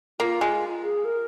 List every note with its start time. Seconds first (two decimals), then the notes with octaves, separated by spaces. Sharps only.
0.20 A#3 F4
0.41 G#3
0.83 G#4
1.05 A#4